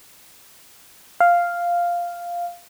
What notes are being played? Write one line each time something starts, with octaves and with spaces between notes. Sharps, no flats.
F5